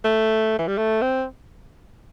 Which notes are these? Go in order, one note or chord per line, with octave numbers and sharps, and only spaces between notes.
A3
E3
G3
A3
C4